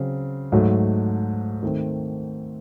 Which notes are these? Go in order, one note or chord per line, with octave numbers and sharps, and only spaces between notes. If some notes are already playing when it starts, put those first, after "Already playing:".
Already playing: C#3 F#3 C4
G#2 F#3 A3
D#3 A3 C4